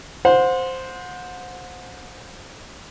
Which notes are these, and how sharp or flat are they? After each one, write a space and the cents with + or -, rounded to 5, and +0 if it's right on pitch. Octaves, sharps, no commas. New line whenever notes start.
C5 +0 F#5 -35